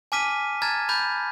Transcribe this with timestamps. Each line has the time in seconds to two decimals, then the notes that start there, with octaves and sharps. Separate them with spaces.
0.12 G#5 A5 D6 F6 B6 D#7
0.62 A5 A#5 F6 G#6 A6
0.89 B5 G6 A6